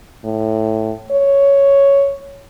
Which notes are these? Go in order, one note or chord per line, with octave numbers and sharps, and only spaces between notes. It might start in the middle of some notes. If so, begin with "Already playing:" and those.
A2
C#5